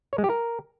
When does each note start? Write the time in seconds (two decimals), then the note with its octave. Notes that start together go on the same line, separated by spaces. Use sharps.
0.13 C#5
0.18 G#3
0.24 G4
0.29 A#4